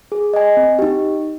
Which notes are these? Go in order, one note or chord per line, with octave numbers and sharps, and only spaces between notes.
G#4
D#5 G#5
C4
D#4 G4